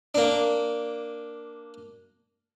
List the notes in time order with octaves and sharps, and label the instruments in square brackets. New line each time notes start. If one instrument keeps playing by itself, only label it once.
[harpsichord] A#3 D4